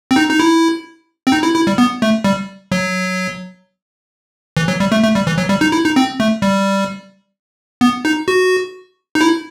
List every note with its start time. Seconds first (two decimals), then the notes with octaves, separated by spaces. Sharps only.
0.11 C4
0.16 D#4
0.29 D#4
0.40 E4
1.27 C4
1.32 D#4
1.43 E4
1.56 E4
1.67 G3
1.78 B3
2.02 A3
2.24 G3
2.72 F#3
4.57 E3
4.68 F#3
4.80 G3
4.92 A3
5.03 A3
5.15 G3
5.27 E3
5.38 F#3
5.49 G3
5.61 D#4
5.72 E4
5.84 D#4
5.96 C4
6.20 A3
6.42 G3
7.81 B3
8.05 D#4
8.28 F#4
9.15 D#4
9.21 E4